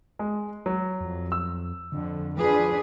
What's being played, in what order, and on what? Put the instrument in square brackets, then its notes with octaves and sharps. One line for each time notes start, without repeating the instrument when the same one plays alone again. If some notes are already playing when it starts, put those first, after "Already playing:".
[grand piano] G#3
F#3
[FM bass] F2
[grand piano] E6
[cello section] F2 [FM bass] D3
[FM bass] F3 [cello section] D4 G#4 B4